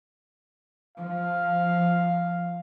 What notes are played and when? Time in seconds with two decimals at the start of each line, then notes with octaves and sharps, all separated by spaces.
0.97 F3 F5